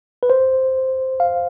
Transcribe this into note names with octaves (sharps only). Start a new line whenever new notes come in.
B4
C5
F5